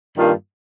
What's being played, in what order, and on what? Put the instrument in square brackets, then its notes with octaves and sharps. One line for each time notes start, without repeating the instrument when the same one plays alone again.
[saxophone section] G2 D#3 A#3 F4